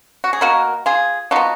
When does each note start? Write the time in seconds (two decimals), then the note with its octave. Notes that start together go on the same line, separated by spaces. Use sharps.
0.24 F#4
0.33 G#4
0.41 B2 A#3 F#4 A#4
0.86 F4 G#4
1.31 F3 B3 D#4 F#4